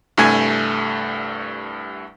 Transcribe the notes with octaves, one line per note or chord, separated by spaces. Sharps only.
C2 G2 A3 G#5 G#6